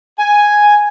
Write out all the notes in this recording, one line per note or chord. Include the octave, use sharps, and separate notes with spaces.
G#5